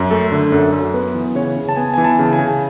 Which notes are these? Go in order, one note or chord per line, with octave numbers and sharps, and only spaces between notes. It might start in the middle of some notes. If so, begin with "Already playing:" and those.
Already playing: F#2
A3 A4
D3
F#2 A4
F#2
B3 B4
E3
C#3 C#5
C#3
A5
B3 G#5
E3 G#5
A5
C#3
G#5
C#3